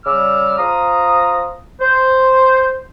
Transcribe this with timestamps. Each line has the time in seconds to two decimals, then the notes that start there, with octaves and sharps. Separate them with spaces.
0.05 C#3 G3 D6 E6 F6
0.58 F3 F5 A#5 D#6
1.81 C5